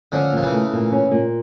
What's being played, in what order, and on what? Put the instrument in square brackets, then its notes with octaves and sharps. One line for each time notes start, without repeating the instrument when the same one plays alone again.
[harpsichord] D3 F3 [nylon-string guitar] C#4
[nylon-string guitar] A#2 [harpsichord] F3
[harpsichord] C#3 E3
[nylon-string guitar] A3
A#2
C#4
A#2